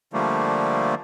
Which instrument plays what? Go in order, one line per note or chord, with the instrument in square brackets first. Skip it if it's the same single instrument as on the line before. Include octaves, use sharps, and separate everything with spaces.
[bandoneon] D3 F3 G3 A3 A#3